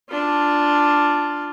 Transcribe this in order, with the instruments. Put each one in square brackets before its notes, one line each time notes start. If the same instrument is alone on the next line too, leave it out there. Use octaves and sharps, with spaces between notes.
[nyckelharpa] D4 F4